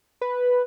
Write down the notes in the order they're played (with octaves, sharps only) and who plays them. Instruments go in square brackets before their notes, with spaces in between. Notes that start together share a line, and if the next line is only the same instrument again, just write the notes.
[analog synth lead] B4